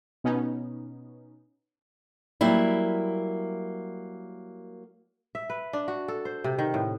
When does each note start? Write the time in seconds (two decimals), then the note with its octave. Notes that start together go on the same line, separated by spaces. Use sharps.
0.24 B2 B3 C#4 D#4
2.41 F#3 G3 A#3 E4
5.35 E5
5.50 B4
5.73 D4
5.88 F#4
6.08 A4
6.25 C5
6.44 C3
6.59 D#3
6.74 A2